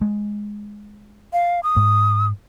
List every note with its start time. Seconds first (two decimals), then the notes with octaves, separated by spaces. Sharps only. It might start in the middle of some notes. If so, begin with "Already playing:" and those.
0.01 G#3
1.33 F5
1.63 D#6
1.76 G#2